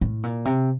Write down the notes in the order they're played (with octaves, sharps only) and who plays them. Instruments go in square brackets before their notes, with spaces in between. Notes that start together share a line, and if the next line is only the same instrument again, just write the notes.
[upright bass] A2
A#2
C3